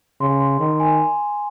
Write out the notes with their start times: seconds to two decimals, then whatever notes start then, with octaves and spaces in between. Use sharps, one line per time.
0.21 C#3 C6
0.40 C6
0.60 D#3 C6
0.80 G#5